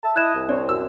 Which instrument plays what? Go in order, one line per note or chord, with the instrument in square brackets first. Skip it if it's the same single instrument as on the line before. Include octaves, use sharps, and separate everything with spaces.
[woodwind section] E5 A5
[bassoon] E4 [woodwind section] D#5 [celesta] F#6 G#6 E7
[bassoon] C2
[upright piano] C4 [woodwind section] C#5 [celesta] D5
[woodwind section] F#2 [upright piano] E6